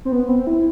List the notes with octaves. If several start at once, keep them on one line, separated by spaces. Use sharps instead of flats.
C4
B3
C4
E4